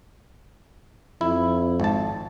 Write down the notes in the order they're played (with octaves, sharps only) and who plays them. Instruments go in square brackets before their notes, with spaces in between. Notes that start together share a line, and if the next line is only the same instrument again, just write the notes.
[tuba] F2 [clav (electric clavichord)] E4
[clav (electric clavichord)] G#1 A5